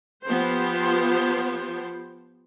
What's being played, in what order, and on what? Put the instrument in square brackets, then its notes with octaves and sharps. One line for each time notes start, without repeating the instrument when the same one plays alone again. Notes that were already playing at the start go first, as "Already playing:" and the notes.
[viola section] F3 B3 G4 C5